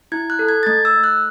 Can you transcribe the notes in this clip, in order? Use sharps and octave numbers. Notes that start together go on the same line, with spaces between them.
E4 G#6
F#6
A4
G#6
A6
A3 G#6
E6
A3
F#6